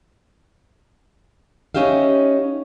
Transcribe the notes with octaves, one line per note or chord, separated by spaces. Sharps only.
C#4 D#4 G4 E5 F5